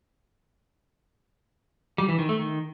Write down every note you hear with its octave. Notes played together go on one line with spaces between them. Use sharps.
G3
E3
D#3
A3
D#3